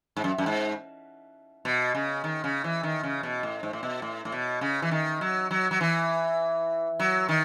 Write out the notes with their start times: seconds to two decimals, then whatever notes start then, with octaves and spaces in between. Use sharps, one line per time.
0.17 G#2
0.24 F#2
0.38 F#2
0.46 G#2
1.65 B2
1.95 C#3
2.24 D#3
2.44 C#3
2.64 E3
2.83 D#3
3.03 C#3
3.23 B2
3.43 A2
3.63 G#2
3.73 A2
3.83 B2
4.02 A2
4.25 A2
4.32 B2
4.61 C#3
4.82 E3
4.91 D#3
5.21 F#3
5.51 F#3
5.71 F#3
5.81 E3
7.00 F#3
7.29 D#3